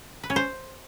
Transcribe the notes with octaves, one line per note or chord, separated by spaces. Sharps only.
B4
C#4
C5